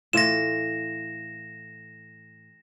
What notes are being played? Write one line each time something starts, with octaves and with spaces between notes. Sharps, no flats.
A2 E3 F4 A#6 E7